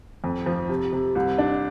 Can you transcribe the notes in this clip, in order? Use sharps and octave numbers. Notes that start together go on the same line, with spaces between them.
F2
F3
C3
C3
C2
D4